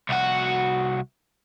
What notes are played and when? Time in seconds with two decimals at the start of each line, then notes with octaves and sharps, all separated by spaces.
0.09 C2 F#4